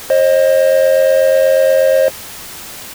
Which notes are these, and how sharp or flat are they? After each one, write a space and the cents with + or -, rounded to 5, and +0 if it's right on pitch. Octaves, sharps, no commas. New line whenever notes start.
C5 +35 D#5 +0